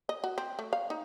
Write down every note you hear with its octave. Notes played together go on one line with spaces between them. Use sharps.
D#5
F#4
C4
A3
F5
D#4